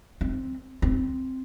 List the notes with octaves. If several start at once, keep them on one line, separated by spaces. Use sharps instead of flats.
C4
C4